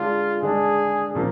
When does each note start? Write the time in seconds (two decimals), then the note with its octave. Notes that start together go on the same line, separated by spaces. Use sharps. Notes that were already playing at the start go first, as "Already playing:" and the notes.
Already playing: D3 G#3 D4 F4
0.42 D3 G#3 D4 G#4
1.15 A#2 F3 A#3